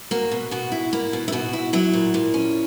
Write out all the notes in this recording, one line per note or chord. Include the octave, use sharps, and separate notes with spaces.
A#3 F#4
B2
B2 F#4
E4
A#3 E4
B2
E4
B2 F#4
E4
F#3 E4
A#2
A#2
C#4